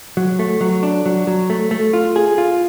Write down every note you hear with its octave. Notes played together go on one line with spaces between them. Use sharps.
F#3
A3
F#3
D4
F#3
F#3
A3
A3
F4
G#4
F4